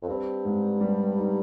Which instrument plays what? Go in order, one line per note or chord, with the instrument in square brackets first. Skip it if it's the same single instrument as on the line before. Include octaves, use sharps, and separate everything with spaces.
[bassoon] F2
[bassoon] G2 [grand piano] C4
[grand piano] G#2
G3
D#4